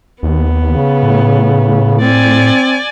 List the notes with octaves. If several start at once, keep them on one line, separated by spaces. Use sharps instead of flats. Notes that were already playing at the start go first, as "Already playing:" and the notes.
D#2 B3
C#3
A2
C4 D5 G#5